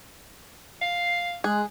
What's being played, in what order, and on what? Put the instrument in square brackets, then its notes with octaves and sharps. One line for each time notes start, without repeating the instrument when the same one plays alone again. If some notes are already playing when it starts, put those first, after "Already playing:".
[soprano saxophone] F5 [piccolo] C7
[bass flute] G#3 [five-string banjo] G#4 [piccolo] F#6